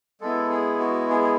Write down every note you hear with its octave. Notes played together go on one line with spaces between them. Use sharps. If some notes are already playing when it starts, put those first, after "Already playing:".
G#3 B3 E4 A4
G#4
F#4
G#4
G#4